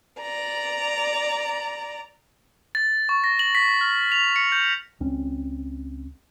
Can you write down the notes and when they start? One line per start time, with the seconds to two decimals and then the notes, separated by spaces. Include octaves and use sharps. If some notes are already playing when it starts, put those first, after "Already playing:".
0.20 D5 A#5
2.75 A6
3.09 C#6
3.24 A#6
3.39 F#7
3.55 B6
3.81 F6
4.12 F7
4.36 C#7
4.52 G6
5.00 C#2 C4 C#4